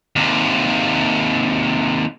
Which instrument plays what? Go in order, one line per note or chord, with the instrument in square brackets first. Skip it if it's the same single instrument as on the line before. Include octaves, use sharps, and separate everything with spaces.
[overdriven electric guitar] D#2 C3